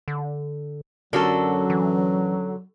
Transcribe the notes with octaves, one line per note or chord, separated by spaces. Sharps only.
D3
F#2 D3 F#3 F#4 A4 A#4
E3